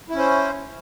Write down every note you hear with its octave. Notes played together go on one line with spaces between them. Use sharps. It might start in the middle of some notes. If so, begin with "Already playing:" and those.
C#4 E4 C5